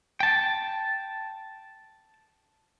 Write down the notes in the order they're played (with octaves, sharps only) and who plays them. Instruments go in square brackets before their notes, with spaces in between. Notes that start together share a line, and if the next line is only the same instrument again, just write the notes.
[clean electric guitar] G5 A5